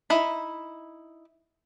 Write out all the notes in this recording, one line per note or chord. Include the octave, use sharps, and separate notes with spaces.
D#4 E4 B5